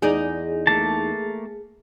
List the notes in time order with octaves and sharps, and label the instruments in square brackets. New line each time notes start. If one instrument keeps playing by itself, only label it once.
[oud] E2 D#4 D5 [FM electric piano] G#4
[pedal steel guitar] A3 A#3 A5